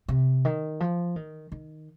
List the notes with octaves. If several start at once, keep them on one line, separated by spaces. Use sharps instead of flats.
C3
D#3
F3
D#3
D#3